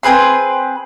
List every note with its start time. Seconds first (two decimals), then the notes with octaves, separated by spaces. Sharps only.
0.03 C4 G#4 B4 C6